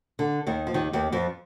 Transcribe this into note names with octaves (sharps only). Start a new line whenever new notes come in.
D3
D#2 D#3
F3
D#2 D#3
D#2 D#3
F2 F3